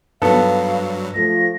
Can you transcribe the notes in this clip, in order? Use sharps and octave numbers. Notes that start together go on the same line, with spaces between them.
G2 F#3 B3 A4 F5
F3 A3 A#6